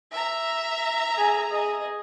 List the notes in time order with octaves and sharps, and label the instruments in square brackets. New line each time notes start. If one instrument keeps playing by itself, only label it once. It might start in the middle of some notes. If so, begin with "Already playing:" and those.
[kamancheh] E5 A#5
[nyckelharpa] G#4 G#5
G#4 D#5